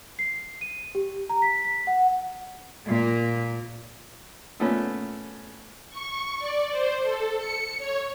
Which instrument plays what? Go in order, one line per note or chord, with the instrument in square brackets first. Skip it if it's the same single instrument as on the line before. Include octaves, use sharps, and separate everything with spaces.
[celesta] C7
D#7
G4
A#5
B6
B6
F#5
[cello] A#2 A#3
[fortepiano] A#2 A3 B3 C#4
[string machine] C#6
D5
C5
A4
C#7
C#5